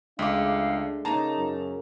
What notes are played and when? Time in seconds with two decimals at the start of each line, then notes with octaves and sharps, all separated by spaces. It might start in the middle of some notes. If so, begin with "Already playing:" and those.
0.19 C#2 G#3 A3 D4 F5 D6
1.05 C#3 A#3 D#4 A5 A#5
1.38 F#2